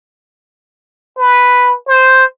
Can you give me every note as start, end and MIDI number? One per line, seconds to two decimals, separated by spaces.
1.18 1.75 71
1.87 2.24 72